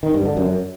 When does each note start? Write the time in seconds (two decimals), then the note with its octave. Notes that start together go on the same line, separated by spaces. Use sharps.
0.03 D#3
0.14 G2
0.25 D3
0.37 F#2